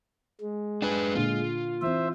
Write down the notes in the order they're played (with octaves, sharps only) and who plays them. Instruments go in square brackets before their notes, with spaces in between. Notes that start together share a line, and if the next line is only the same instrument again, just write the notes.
[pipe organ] G#3
[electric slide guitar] D4 B4 [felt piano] G#5
[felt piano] A#2 D3 [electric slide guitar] F4
[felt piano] E3 C4 [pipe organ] C5 E5